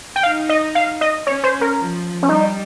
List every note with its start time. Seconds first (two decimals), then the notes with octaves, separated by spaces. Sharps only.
0.16 G5
0.23 D#4 F5
0.49 D#5
0.75 F5
1.01 D#5
1.27 C#4 C#5
1.44 C5
1.61 A#4
1.78 F3
2.23 C#4
2.29 G3 D#4